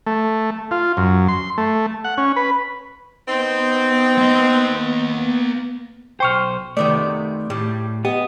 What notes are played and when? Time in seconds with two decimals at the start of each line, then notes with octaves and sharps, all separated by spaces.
0.06 A3
0.71 F4
0.97 F#2
1.28 C6
1.58 A3
2.04 F#5
2.18 C#4
2.36 B4
3.28 B3 C4 D#4
4.18 A#3 D#5
6.20 B1 C5 G5 C#6 F6
6.77 C3 D#3 A3 B3 D5
7.50 A2 G3
8.05 B3 G4 D#5